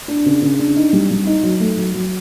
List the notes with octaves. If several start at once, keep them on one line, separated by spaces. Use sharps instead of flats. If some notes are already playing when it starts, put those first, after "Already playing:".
D4
C#3
C#3
D4
D#4
G3
G3
D#4
F#3
A3
F#3
F#3